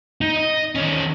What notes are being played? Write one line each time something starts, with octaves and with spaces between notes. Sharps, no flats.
D#4
D#5
D#3 C#4